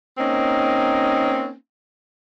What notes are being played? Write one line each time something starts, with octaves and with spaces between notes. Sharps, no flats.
A#3 C4 C#4 D#4